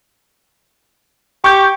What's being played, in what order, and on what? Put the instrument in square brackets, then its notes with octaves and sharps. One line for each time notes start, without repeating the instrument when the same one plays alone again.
[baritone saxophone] G4 [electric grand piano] C#6 G6